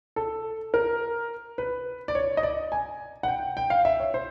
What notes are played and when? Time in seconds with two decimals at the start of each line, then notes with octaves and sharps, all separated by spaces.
0.16 A4
0.74 A#4
1.58 B4
2.08 D5
2.15 C#5
2.37 D#5
2.43 D5
2.72 G#5
3.23 F#5
3.28 G5
3.57 G5
3.70 F5
3.85 E5
4.00 C#5
4.14 C5